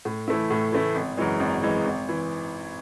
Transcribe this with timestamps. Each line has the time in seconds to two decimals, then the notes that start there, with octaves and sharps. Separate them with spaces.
0.05 A2
0.28 E3 A3 E4
0.50 A2
0.72 E3 A3 E4
0.95 G#1
1.17 F#2 E3 G#3
1.40 G#1
1.62 F#2 E3 G#3
1.85 G#1
2.09 E3